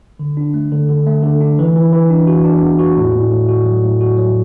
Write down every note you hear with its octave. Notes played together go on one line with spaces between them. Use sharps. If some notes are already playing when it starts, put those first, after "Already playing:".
D3
D4
A3
D3
D3
A3
D3
D4
E3
E3
E3
D4
F#4
D4
E2
F#4
A2
A2
A2
F#4
F#3
A2
F#4
F#3